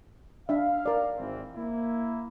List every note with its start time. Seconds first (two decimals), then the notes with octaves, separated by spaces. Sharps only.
0.49 D4 E5 F5
0.86 A#4 D5
1.18 G#1 E3 C4
1.55 A#3 E4